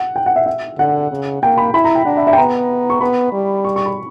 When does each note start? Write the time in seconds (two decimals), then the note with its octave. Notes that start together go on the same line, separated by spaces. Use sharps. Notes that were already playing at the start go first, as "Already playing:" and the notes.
Already playing: F#5
0.16 G5
0.26 F#5
0.36 E5
0.46 E5
0.78 D3 F#5
1.11 C#3
1.42 A#3 G5
1.58 B5
1.74 E4 B5
1.84 A#5
1.95 G5
2.05 D4 F#5
2.17 E5
2.27 E5
2.33 G5
2.37 B3 A#5
2.90 C#6
3.01 B3 B5
3.32 G3
3.64 C#6
3.76 C#6
3.86 B5